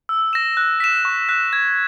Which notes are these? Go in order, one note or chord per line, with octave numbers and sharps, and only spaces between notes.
E6
A#6 E7
F#6
B6 E7
C#6
F#6 B6
G#6